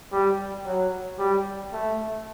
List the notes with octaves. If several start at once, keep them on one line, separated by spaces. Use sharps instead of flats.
G3
F#3
G3
A3